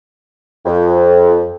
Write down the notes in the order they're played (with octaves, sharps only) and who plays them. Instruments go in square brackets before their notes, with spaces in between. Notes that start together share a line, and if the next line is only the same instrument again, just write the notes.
[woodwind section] F2